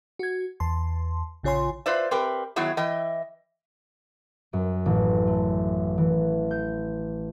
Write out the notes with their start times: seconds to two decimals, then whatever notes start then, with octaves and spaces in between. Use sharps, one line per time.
0.19 F#4 G#6
0.60 E2 A5 C6
1.43 A#1 C#3 F4 C#5 G#5 C6
1.86 F4 B4 C5 D5 E5
2.11 C4 G4 A#4 B4 G5
2.56 D#3 F#3 B3 E4 G#4 E5
2.77 E3 D#5 E5 G5
4.53 F#2
4.86 A1
5.27 A3
5.98 E3
6.51 G6